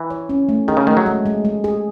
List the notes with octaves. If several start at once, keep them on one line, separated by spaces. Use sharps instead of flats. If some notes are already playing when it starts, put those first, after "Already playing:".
Already playing: E3
C#5
C#4
A3
D#3 G#4
C#3
D#3 A3
F#3
G#3
G#3
G#3
G#4